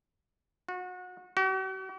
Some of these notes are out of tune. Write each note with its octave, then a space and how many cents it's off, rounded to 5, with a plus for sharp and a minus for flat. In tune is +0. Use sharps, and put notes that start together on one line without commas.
F#4 -30
F#4 +45